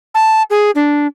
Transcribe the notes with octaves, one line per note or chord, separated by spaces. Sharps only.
A5
G#4
D4